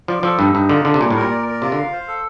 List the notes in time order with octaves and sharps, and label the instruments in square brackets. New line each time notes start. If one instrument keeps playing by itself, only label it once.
[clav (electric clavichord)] F3 [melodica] D5
[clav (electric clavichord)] F3 [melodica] A4
[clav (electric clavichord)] G2 [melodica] D#4
[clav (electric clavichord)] G2 [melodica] D#4
[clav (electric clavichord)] D3 [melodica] F4
[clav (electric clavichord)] D3 [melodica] D4
[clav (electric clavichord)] C3
[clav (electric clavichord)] A#2 [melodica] G3
[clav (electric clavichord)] A2
[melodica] A#4
[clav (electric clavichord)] A#2
[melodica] D5
A#4
[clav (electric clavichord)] C3 [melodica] F4
[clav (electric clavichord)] D3
[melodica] F5
C5
A4